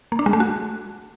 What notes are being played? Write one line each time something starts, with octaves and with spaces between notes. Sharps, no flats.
A#3
D4
G#3
A3
F#4